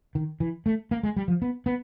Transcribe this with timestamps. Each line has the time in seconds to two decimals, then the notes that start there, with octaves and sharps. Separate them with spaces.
0.15 D#3
0.40 E3
0.66 A3
0.91 A#3
1.03 G#3
1.16 G3
1.28 F3
1.42 B3
1.66 B3